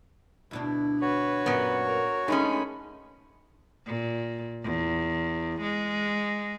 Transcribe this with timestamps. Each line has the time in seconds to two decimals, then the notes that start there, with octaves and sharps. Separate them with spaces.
0.51 D2 B2 D4 E4
1.01 F#4 B4 C#5
1.46 F#2 A#2 B3
1.86 A#4
2.28 D#3 G#3 A3 C#4 D#4 B5
3.86 A#2
4.64 E2
5.61 G#3